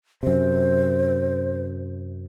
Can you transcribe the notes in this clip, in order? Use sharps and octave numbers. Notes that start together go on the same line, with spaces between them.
F#2 C3 C5